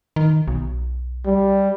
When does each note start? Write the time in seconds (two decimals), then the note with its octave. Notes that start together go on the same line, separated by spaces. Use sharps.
0.16 D#3
0.48 B1
1.26 G3